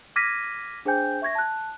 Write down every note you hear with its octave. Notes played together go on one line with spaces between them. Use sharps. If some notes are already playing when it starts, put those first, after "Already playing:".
D6 F6 G#6 A#6 B6 D#7
D4 G#4 C5 G5 G#5 G6
E5 C#6 G#6 A#6
A5 F#6